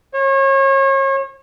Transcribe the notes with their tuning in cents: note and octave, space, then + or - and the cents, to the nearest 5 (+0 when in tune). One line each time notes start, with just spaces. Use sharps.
C#5 -35